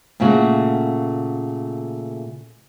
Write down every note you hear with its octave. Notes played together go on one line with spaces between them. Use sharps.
A#2 C#3 A3 F#4